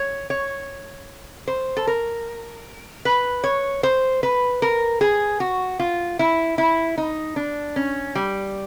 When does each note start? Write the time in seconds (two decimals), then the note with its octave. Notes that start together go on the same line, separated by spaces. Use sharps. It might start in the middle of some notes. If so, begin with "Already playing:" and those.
Already playing: C#5
0.30 C#5
1.48 C5
1.77 A4
1.87 A#4
3.05 B4
3.44 C#5
3.83 C5
4.23 B4
4.62 A#4
5.01 G#4
5.40 F#4
5.79 F4
6.19 E4
6.58 E4
6.98 D#4
7.36 D4
7.76 C#4
8.15 G3